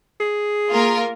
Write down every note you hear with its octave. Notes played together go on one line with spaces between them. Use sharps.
G#4
A#3 F4 A#4